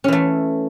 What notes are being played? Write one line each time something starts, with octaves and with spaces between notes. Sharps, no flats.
E3 A3 C#4